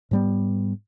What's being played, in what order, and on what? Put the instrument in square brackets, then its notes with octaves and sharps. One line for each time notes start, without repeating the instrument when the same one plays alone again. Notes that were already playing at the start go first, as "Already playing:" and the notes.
[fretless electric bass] G#2 G3 B3